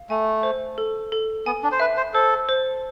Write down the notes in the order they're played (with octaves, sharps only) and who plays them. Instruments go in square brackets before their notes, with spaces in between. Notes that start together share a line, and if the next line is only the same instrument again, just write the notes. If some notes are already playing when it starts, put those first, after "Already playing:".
Already playing: [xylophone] F5
[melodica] A3 [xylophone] G#5
[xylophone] C5
A4
A4
[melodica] B3 [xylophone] G#5
[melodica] D4
C5
[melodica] B4 [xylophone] E5
[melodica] C5
[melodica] A4 [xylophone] C5
[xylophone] C5